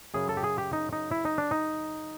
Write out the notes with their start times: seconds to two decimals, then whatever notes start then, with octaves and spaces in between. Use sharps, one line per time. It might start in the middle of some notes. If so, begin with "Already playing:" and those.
0.14 F#2 C#3 F#3 G#4
0.29 A4
0.37 G4
0.44 G#4
0.58 G4
0.73 D#4
0.93 D#4
1.11 E4
1.25 D#4
1.38 D4
1.51 D#4